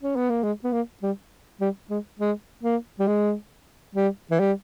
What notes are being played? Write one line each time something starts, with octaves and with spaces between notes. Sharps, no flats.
C#4
B3
A#3
G#3
B3
A#3
G3
G3
G#3
G#3
A#3
G3
G#3
G3
E3
G3